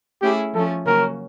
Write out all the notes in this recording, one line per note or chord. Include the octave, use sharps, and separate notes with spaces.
A3 C#4 E4 G4 G#4
F3 A3 C#4 A4
C#3 F#3 A#3 C#4 F#4 A#4